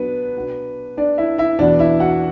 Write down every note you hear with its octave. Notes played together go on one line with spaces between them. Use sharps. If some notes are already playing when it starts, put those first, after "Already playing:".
Already playing: F#3 B3 D4 B4
B2 B3 D4
D4 D5
E4 E5
E4 E5
E2 B2 B3 D4 D5
E4 E5
F#4 F#5